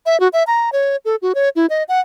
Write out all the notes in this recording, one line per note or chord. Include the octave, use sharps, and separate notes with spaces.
E5
F#4
E5
A#5
C#5
A4
F#4
C#5
E4
D#5
F#5